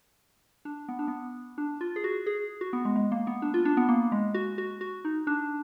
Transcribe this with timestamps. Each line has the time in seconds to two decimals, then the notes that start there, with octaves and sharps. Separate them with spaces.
0.65 D4
0.88 B3
0.99 D4
1.08 B3
1.58 D4
1.81 F4
1.96 G#4
2.04 F#4
2.26 G#4
2.61 F#4
2.73 B3
2.85 G#3
2.96 G#3
3.12 A#3
3.27 B3
3.42 D4
3.54 F4
3.65 D4
3.77 B3
3.89 A#3
4.12 G#3
4.34 F#4
4.58 F#4
4.81 F#4
5.05 D#4
5.27 D4